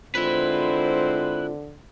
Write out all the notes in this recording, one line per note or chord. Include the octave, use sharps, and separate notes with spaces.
D3 G#3 C4 E4 F4 B4 C5